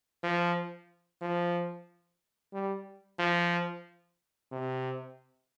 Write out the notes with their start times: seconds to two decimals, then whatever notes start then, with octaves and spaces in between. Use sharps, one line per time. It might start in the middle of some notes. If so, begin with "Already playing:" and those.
0.23 F3
1.21 F3
2.53 G3
3.19 F3
4.51 C3